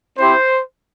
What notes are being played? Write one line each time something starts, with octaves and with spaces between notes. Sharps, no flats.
C4 E4 G4 C5